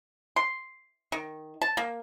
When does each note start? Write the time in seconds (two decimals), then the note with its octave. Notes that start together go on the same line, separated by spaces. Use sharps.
0.36 C6
1.12 D#3
1.62 A5
1.77 A#3